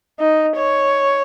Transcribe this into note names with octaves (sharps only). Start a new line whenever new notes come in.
D#4
C#5